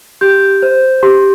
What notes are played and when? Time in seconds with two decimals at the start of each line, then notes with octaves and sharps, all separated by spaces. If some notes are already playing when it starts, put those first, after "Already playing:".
0.21 G4 G6
0.62 C5
1.03 G4